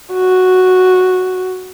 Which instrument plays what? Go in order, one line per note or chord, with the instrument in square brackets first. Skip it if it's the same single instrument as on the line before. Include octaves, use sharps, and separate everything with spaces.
[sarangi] F#4